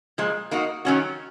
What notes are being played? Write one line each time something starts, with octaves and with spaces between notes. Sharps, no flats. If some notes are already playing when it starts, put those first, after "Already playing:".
A#2 F3 G#3
A#3 D#4 F#4
D#3 F#3 C#4 F#4